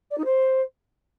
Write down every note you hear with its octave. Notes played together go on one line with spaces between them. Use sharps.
D5
D#4
C5